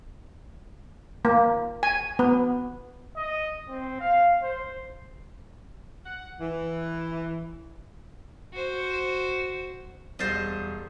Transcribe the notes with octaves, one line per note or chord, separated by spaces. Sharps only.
A#3
G#5
B3
D#5
C4
F5
C5
F#5
E3
F#4 C5
E1 G3 C5 D#5 A6